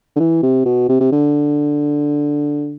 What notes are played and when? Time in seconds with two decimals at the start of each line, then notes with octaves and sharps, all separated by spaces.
0.16 D3
0.20 E3
0.43 C3
0.65 B2
0.89 C3
1.00 C3
1.12 D3